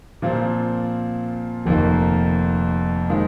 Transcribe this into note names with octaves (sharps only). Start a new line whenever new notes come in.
A#2 F3 C4 F4
F1 F2 D#3 A#3
D#3 G#3 C4 F4